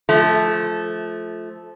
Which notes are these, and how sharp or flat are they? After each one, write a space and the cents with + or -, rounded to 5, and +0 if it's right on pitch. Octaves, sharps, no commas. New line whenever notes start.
F3 +0 A3 -20